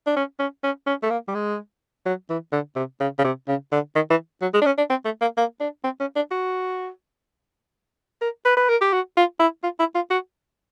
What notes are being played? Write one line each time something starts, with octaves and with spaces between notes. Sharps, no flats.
D4
C#4
C#4
C#4
C#4
A3
A#3
G3
G#3
F#3
E3
D3
C3
C#3
C#3
C3
C#3
D3
D#3
E3
F#3
G#3
D4
C#4
D4
C4
A3
A#3
A#3
D4
C4
C#4
D4
F#4
A#4
B4
B4
A#4
G4
F#4
F4
E4
F4
E4
F4
F#4